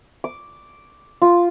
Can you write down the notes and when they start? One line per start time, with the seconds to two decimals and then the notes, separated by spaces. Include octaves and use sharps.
0.24 D6
1.22 F4